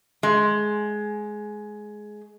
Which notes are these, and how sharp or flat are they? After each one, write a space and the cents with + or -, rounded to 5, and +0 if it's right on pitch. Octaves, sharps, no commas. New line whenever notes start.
G#3 +15